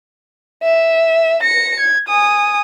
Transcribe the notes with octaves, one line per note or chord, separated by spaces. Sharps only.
E5
A#6 C#7
G#6
G#5 D#6